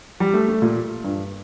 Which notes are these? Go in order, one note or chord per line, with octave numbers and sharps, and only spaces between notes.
G3
A3
A3
A#2
G2